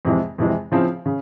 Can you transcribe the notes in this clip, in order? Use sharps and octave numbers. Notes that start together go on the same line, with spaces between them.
F2 C3 E3 G#3
F2 C3 E3 G#3
C#3 F3 C4 E4
C#3